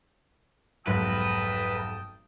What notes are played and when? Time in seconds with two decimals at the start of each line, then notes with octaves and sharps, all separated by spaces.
0.87 F1 B1 G#2 B4 G5 A5 D#6